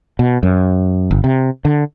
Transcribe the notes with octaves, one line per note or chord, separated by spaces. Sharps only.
B2
F#2
G1
C3
D3